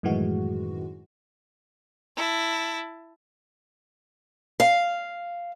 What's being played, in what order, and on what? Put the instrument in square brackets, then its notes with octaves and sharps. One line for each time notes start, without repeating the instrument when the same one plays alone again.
[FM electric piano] F#2 A2 D#3 E3 G#3 F#4
[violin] E4 A5
[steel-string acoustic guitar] F5